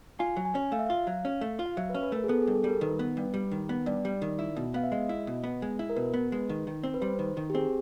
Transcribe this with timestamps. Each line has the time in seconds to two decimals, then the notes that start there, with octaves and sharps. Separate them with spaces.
0.19 F4 G#5
0.37 F#3
0.45 G#5
0.55 C#4
0.72 A3 F5
0.79 E5
0.87 F4 F5
1.07 F#3
1.25 C#4
1.41 A3
1.59 F4
1.66 F5
1.77 F#3 E5
1.90 B4
1.95 C#4
2.03 B4
2.12 A3 A#4
2.24 G#4
2.29 B3 A4
2.42 G#4
2.47 G2
2.55 A4
2.64 G3 A#4
2.81 D#3 B4
2.99 B3
3.17 G2
3.34 G3
3.51 D#3
3.69 B3
3.86 G2 D5
4.05 G3
4.22 D#3
4.39 E4
4.56 B2
4.74 B3 F5
4.84 E5
4.92 G#3 D#5
5.09 E4
5.27 B2
5.44 B3
5.62 G#3
5.79 E4
5.90 A#4
5.96 B2 B4
6.14 B3
6.32 G#3
6.49 D#3
6.67 D#3
6.84 C4
6.94 B4
7.01 G3 C5
7.19 D#3
7.37 D#3
7.50 G4
7.54 C4 G#4